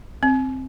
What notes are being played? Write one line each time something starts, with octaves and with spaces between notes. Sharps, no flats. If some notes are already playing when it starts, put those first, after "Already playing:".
C4